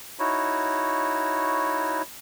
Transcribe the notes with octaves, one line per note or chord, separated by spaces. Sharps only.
D#4 E4 F#4 C#5